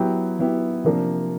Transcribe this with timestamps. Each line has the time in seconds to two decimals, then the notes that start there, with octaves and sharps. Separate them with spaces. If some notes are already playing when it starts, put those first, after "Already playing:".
Already playing: F#3 B3 E4 G4
0.39 F#3 B3 E4 G4
0.84 C3 F3 A#3 D4